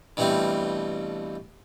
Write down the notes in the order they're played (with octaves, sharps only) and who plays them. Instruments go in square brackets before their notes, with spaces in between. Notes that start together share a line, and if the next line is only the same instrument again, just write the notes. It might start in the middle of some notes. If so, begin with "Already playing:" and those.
[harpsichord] G2 B2 E3 G3 A3 C4